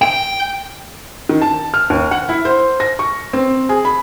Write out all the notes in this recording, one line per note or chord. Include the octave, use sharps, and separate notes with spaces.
G5
D#3
A5
F6
D#2
F#5
E4
C5
A#6
C#6
C4
G#4
B5